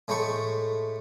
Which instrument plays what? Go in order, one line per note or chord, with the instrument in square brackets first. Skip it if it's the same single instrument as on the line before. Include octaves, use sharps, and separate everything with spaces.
[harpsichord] A2 G#3 A3 G5 B5 C#6